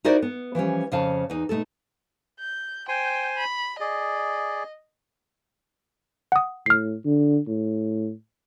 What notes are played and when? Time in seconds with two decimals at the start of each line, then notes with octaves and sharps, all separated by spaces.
0.04 D#4 E4 F#4 A#4 C5 D5
0.22 B3
0.55 E3 F3 G3 C#4
0.92 F2 C#3 F5 A5
1.30 E2 D#4
1.49 B2 A3 D#4 A4
2.40 G6
2.88 C5 G5 G#5 C6
3.37 B5
3.80 G#4 D5 D#5
6.32 F#5 D#6
6.66 A2 F6 C7
7.06 D3
7.47 A2